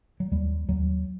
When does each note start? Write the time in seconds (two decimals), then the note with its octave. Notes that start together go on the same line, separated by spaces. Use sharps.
0.20 F#3
0.31 D#2 G3
0.68 D#2 F#3